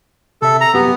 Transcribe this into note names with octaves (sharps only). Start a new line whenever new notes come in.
C3 A4 E5
A#5
C2 F#2 B3 G4